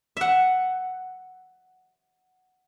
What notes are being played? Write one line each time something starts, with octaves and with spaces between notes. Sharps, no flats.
E5 F#5